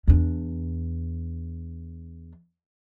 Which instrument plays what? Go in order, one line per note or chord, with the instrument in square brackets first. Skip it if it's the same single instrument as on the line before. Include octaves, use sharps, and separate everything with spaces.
[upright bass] E2 D4